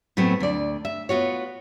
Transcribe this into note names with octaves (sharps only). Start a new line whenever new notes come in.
A2 F#3 A3 B3 C4
D2 D5
E5
B3 F4 F#4 C#5